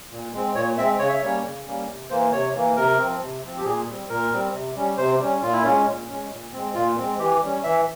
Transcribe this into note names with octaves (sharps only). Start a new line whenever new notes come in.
A#2
G#3 C4
A#2 C#5
G#3 C4 E5
C#3 C#5
E5
C#5
G3 A#3 C#4
C#3
G3 A#3 C#4
C3
E3 A#3 C5
C3 C#5
E3 A#3
C3 A#4
F3 C4
C3
F3 C4
G4
A#2 G#4
G3 C4
A#2 A#4
G3 C4
C3
G3 C#4
C3 C5
G3 C#4
A#2 F4
E4
G#3 C#4 F4
A#2
G#3 C#4
A#2
G#3 C4
A#2 F4
G#3 C4
E3 G4
G3 C#4
E3 E5